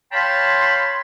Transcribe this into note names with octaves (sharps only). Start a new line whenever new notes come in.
C#5 F5 G5 A5 B5 C6